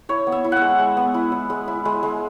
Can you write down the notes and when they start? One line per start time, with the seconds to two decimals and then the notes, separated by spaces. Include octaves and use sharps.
0.09 E4 C#5
0.27 B3
0.32 E5
0.44 E4
0.52 E5 F#5
0.62 G#3
0.79 G#3
0.97 B3
1.14 E4
1.32 E4
1.50 G#3
1.68 E4
1.85 G#3
2.03 G#3